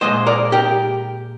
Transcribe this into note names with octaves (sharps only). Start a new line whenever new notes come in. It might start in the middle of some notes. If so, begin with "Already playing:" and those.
A#2 G#3 C5 D#5
A#4 D5
G4 A#4